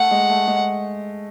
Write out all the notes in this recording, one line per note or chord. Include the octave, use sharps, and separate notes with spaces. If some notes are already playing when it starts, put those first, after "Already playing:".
Already playing: A3 F#5
G#3
A3
G#3